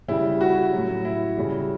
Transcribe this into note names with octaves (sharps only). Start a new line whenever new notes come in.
C#3 G3 E4
F#4
A2 F#3
E4
C#3 G3